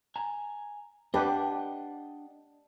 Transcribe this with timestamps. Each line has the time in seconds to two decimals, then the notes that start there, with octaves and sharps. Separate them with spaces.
0.16 G#5 A#5
1.14 D4 G4 B4 D#5 F#5 G5